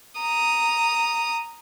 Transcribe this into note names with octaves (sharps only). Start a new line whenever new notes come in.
A#5 D#6